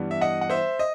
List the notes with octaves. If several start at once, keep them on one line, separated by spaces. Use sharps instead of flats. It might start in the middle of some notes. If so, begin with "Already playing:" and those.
Already playing: G2 E3 G3 B3
E5
D#5 F#5
F#5
C5 E5
D#5